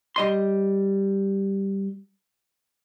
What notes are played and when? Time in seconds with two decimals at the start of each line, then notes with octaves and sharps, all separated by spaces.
0.16 G3 D#5 C6